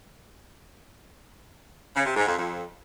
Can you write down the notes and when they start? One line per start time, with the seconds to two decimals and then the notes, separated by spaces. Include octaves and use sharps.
1.95 C#3
2.06 C3
2.17 G#2
2.27 F2
2.38 F2